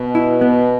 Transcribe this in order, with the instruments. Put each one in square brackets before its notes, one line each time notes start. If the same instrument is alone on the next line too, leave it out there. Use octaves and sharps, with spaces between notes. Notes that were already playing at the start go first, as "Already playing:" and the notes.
Already playing: [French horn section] B2
[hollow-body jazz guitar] E4
B3